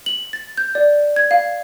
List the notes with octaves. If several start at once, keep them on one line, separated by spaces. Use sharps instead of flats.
F#7
A6
G6
D5
G#6
F5